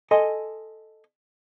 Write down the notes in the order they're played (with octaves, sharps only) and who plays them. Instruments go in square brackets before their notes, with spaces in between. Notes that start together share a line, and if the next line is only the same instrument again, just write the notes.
[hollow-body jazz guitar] A4 D#5 G#5 C6